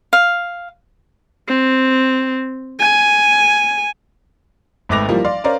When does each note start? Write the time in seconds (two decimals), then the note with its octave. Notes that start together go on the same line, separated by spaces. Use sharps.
0.13 F5
1.48 C4
2.80 G#5
4.89 G#1 A3 B4 D6 A#6 F7
5.09 E3 F3 G3 A#3
5.24 D5 F5 C6
5.44 C#4 A#4 C5 D5 F5